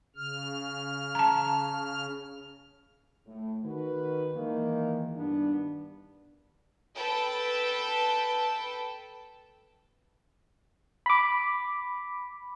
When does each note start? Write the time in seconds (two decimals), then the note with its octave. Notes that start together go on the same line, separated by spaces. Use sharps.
0.16 C#3 F6
1.15 A5 A#5
3.27 A2
3.64 D#3 F#4 B4
4.36 D#3 E3 G#3 A#3
5.17 G2 D#3 B3 D4
6.95 A4 B4 G5 A5
11.06 B5 D6